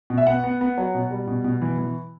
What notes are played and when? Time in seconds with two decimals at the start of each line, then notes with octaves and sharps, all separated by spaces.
0.10 B2
0.18 E5
0.27 B3 F#5
0.44 B3
0.61 B3
0.78 F#3
0.94 B2
1.11 G3
1.27 B2
1.44 B2
1.62 E3
1.78 E3